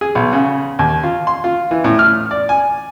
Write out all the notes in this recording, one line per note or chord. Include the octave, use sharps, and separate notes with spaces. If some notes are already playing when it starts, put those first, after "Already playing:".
G#4
B1
C#3
D#2
F4
C6
F4
E3
A2
F6
D5
G#5